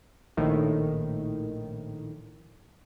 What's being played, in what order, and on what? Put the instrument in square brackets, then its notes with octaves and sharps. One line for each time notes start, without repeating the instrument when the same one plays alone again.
[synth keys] A#1 A2 D#3